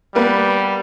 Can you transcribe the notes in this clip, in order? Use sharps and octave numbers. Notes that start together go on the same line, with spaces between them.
G3 A#3 B3 B4